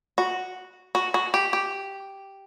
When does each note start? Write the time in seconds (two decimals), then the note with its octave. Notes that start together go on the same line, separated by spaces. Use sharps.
0.18 F#4
0.95 F#4
1.14 F#4
1.34 G4
1.53 G4